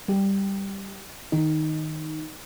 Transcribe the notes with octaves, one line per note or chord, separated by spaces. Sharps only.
G3 G4
D#3 D#4